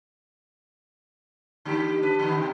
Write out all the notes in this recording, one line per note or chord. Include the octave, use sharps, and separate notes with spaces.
D3 A#3 G4
D4 B4
D3 D#3 B3
B2